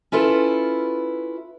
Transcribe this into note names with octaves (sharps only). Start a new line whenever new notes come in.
C#4 E4 F4 A4 B4